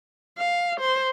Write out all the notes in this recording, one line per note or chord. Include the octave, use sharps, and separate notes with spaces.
F5
C5